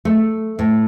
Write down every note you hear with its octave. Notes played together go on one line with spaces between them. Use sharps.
A3
A2